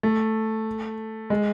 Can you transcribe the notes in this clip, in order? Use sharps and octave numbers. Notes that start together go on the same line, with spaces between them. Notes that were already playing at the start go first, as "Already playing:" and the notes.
A3
G#3